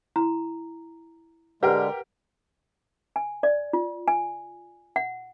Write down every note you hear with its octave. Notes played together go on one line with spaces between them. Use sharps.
E4 A#5
D3 G#3 G4 A#4 B4 F#5
G#5
D5
F4
G#5
F#5